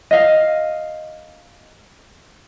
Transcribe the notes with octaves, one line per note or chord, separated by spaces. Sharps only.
D#5 F5